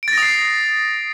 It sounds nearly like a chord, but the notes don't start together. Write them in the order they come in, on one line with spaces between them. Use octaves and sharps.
D7 A6 A#6 D#6 C7